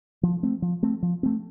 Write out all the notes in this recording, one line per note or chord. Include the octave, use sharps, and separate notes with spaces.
F3
A3 C4
F3
A3 C4
F3
A3 C4